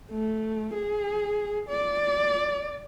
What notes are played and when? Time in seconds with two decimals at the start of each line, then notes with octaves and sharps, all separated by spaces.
0.11 A3
0.73 G#4
1.69 D5